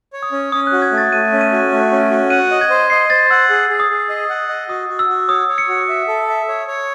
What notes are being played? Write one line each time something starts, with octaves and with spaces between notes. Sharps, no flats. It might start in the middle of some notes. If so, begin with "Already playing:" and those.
C#5
D#6
C#4
C#4 D#6
F#6
F#4
G#6
A3
A6
A3 D#7
C#4
D#7
F#4
A3
C#4
F#4
F#5 D#7
D#5
G#6
C5
D#5 C7
C5 A6
F#5 E6
G#4
G#4
D#6
G#4
D#5
F#5
D#5
F#4 D#6
F#4
E6
F#4
C#5 D#6
C#5
C#7
F#4
E5
A4
E5
C#5
C#5